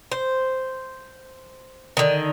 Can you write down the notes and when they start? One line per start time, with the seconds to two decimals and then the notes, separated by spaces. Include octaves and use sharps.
0.12 C5
1.97 D3 D#3